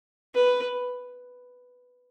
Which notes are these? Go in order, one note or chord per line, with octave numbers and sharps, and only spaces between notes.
B4